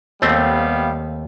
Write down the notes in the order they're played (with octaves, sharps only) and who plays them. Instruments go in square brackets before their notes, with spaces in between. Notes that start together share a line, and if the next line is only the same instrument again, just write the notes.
[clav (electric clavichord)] D#2 A3 C4 [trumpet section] G3 B3 F5